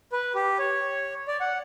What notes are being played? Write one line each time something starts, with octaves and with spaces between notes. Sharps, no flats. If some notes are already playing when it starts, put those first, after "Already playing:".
B4
G4
C#5
D5
F#5